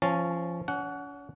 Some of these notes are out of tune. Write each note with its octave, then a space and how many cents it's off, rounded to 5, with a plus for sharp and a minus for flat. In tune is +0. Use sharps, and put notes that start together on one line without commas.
F3 -20 C#4 -5 A5 +0
C#4 +40 F#5 +0